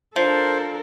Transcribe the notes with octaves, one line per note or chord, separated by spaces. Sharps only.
F3 D4 A4 A#4 C5